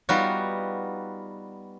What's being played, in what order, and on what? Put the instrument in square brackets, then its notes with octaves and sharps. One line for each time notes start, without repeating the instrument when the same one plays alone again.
[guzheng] G3 B3 D#4 F4 F#4